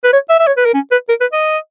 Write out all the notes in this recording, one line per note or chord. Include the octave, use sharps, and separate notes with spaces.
B4
C#5
E5
E5
C#5
B4
A#4
C#4
B4
A#4
B4
D#5